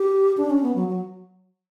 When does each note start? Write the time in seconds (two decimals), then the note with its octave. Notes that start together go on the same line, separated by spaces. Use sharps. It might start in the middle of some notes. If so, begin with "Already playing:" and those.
Already playing: G4
0.37 D4
0.50 C#4
0.63 B3
0.75 F#3
0.88 F#3